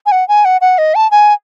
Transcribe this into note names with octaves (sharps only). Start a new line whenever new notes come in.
G#5
F#5
G#5
F#5
F#5
D#5
A5
G#5